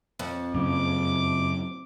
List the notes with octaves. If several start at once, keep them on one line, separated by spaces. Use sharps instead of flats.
F2
F#2 C#3 D6